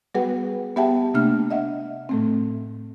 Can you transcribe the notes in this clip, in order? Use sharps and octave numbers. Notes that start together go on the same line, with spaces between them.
G3 B3 F#4 G#4 B4 F#5
B3 G4 E5 F#5 G5 A5
C3 A3 A#3 D4 F6
D#5 E5 F#5
A2 A3 C4